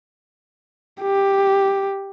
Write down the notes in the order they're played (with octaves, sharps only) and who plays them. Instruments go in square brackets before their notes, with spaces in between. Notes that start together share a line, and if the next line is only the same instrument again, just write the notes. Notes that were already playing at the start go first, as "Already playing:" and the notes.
[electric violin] G4